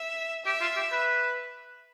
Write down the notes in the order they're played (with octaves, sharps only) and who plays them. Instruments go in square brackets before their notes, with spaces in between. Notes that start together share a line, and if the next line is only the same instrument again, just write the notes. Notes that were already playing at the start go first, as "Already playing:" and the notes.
Already playing: [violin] E5
[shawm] G4 [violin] E5
[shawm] F4
G4
B4